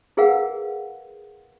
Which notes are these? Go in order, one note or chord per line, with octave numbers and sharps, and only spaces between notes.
E4 G#4 A#4 B4 F5 F#5